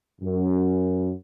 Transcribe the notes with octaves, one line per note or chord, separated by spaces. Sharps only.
F#2